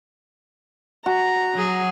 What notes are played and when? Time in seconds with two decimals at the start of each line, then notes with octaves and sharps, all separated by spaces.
1.06 F#4 A#5
1.54 F#3 G#4